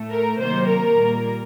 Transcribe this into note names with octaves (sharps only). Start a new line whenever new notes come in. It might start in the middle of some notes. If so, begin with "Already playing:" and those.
Already playing: A2 A3
A#4
C3 D#3 F#3 A#3 C5
A#4
A#2 G3 A#3